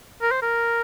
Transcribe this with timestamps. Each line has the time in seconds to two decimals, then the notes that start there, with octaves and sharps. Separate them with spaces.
0.21 A#4
0.31 C5
0.42 A#4